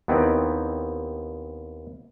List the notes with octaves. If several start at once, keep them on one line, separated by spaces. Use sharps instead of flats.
D#2 B3 C4 D#4 E4 D5